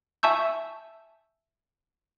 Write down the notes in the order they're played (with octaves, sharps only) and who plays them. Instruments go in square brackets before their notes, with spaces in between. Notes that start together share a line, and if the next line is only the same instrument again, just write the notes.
[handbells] E5 G#5 A5 C#6 E6 G6